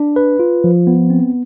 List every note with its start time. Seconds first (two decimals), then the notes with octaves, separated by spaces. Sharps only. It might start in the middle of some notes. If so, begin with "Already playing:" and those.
Already playing: D4
0.16 B4
0.40 F4
0.64 F3
0.87 B3
1.10 C4